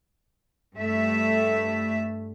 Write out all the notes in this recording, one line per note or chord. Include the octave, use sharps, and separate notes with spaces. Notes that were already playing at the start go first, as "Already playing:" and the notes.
G2 A3 E5